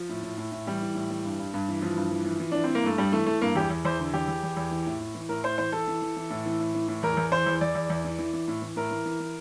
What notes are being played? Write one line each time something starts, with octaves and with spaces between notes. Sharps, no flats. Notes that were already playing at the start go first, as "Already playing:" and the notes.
Already playing: F3
A2
A2
A2
A2
E3 G3
E3
A2
E3
G2
G2
G2
E3
E3 F3
G2
E3
E3
E3
E3 D4
C4
E3
A#3
G2 A3
G2 G3
E3 A3
E3 A3
G2 A#3
E2 G4
E2
E2 C5
D3
E2 G4
E2
E2
E2
E3
A2
A2
E3
A2 A#4
A2 C5
E3 C5
E3 A4
E3
E3
E3
A2
E3
A2
E3
A2
E2 A#4
E2
E3 C5
E2
E2 D5
E2
E2
E3
E3
E3
A2
E3
A2 A#4
E3
E3
E3